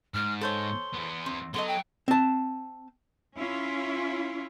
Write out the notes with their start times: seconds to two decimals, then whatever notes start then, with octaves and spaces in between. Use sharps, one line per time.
0.14 G#2 F6
0.41 A4 C5 C#5 C6
0.94 E2 B3
1.26 C4
1.54 F#3 B3 A4 D#5 C6
1.67 G5
2.08 C4 A5
3.36 C#4 E4 F4